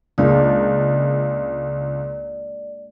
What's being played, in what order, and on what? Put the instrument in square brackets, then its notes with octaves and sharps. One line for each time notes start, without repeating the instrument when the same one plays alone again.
[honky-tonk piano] C#2 [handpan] G#3 A#3 D4 [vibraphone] D5